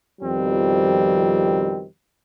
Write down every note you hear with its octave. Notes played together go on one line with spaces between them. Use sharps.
F2 B2 D#3 F3 G3 C4